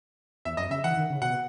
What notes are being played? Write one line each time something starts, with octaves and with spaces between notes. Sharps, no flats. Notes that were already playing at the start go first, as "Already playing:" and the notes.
E2 E5
F#2 D#5
C#3 E5
E3 F#5
D#3
C#3
B2 F#5